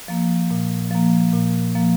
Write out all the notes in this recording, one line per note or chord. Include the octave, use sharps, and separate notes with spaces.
F3 A#3
A#2
F3 A#3
A#2
F3 A#3